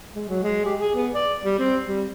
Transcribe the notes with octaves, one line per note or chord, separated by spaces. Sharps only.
G#3
F#3
G#3
G4
G#4
B3
D5
G3
C4
G3